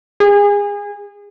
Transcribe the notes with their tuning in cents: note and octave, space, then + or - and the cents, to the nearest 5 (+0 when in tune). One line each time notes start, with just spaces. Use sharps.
G#4 -30